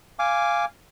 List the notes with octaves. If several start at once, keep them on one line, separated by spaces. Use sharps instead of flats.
F5 G#5 D6